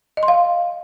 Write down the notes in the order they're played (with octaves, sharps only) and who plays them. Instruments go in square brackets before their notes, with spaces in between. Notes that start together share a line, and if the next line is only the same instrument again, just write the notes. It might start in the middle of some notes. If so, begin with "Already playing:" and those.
[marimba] D#5
C6
F5